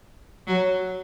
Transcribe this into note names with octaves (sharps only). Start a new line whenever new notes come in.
F#3